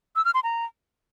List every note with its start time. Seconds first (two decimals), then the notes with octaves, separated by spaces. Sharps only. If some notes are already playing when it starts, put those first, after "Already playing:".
0.16 E6
0.25 F6
0.34 C6
0.44 A#5